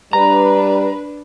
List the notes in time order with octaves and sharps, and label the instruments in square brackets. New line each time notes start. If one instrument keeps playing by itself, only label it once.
[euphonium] G3 [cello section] D4 [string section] B4 [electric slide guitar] A#5